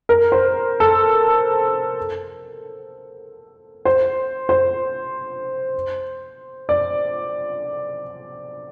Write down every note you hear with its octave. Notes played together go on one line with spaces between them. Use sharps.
A#4
C5
A4
C5
C5
D5